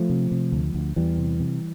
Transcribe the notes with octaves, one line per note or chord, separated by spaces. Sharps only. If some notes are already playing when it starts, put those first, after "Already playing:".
Already playing: F3 A3
C3
C3
D2
D2
E2 E3 G3
C3
C3